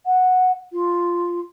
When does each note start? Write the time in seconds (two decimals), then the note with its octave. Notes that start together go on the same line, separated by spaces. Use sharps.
0.06 F#5
0.73 F4